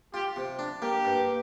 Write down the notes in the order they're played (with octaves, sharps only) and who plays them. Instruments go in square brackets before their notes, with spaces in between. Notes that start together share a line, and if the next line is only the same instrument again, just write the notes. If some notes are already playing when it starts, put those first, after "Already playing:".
[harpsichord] F4 [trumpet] G4
[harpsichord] C3
D4
[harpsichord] A#3 [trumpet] G4
[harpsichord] G2